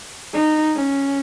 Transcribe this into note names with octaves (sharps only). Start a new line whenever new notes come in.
D#4
C#4